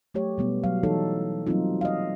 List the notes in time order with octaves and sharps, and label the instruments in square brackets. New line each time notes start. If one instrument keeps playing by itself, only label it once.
[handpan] F#3 A3 G4 C#5
B2 G3 B3
F#3 F5
E3 D#4 A4 C#5
F#3 G3 A#3 C4 D#4 F4
D#5 F5